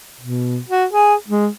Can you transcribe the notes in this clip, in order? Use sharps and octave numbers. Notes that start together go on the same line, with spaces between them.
B2
F#4
G#4
G#3